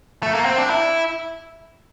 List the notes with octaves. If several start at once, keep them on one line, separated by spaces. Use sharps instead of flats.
A3
A#3
C4
D4
E4